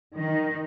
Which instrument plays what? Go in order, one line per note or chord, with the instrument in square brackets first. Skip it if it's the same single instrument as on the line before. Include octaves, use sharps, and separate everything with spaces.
[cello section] D#3